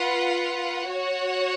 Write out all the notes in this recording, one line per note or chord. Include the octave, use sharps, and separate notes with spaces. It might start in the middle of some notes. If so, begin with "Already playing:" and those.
Already playing: F4 B4 F#5
F#4 C#5 F#5